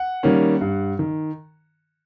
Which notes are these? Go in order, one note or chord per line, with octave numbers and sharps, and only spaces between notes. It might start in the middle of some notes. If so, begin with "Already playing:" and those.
Already playing: F#5
D#3 G3 A#3 C#4
G2
D#3